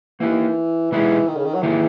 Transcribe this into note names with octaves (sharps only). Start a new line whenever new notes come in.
E3 A#3 D#4 A#4
B2 E3 G#3 D#4 G#4 B4
D#3
C#3
D#3
F#3
D#3 E3 A#3 D#4 G#4 B4